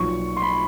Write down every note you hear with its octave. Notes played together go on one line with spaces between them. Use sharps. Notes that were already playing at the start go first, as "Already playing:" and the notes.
Already playing: B1 A#2 F3 C#6
C6
B5